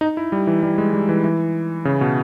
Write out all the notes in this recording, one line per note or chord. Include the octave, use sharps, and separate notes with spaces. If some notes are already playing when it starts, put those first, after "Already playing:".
D#4
E4
G3
E3
G3
G#3
G3
E3
E3
C#3
B2